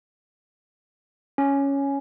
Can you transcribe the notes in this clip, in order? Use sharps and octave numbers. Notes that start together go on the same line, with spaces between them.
C#4